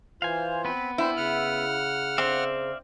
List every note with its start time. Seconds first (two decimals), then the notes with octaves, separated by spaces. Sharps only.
0.22 E3 F4 C5 F5 G#5
0.65 B3 C4 B4
0.98 C4 D4 E4 C5
1.17 C#3 F#5 F6
2.18 C4 D5 E5 F5